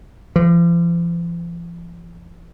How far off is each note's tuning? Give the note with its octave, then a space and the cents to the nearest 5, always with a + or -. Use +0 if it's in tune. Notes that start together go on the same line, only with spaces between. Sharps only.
F3 -45